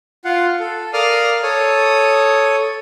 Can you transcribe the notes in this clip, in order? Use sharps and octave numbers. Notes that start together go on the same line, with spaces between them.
F4 F5 F#5
A4
A#4 D5 F5 D#6 F6
A4 C#5 D#6